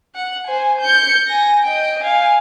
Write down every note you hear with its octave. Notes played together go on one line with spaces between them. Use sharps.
F#5
C5 G#5
G6 C#7
G#5 A#6
D#5 G5
F5 G#5